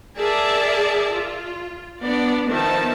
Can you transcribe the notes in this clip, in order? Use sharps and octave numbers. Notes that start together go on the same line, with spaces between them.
G#4 A#4 D5 E5 A5
F4
B3 D4 D5
D#3 F3 B3 E5 A5